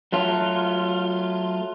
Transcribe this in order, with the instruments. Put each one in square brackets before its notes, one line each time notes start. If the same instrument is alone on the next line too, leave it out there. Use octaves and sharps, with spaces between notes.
[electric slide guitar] F#3 A3 F4